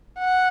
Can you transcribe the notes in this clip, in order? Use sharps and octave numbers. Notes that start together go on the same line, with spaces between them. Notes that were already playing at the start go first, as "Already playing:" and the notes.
F#5